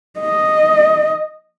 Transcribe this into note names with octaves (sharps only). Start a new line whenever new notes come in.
D#5